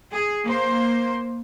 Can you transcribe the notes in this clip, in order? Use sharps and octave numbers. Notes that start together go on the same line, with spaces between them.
G#4
A#3 C5